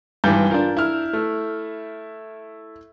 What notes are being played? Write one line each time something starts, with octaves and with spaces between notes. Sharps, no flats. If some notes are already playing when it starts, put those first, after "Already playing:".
G#1 G2 E3 G6
D4 F4 A#4
E4 F6
A3